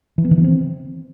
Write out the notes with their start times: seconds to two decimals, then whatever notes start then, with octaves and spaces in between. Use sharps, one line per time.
0.18 E3
0.25 B3
0.31 D#3
0.38 E3
0.44 C4